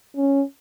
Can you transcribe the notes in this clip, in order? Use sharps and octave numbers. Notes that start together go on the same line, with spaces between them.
C#4